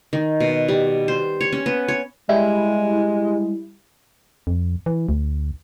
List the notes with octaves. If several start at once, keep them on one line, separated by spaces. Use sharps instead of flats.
D#3
B2
G3
C5
C#5
C#4
B3
C#5
G3 G#3 E4
F2
E3
D2